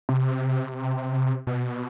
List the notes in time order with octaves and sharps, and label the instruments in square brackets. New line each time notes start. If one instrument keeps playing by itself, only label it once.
[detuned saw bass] C3
B2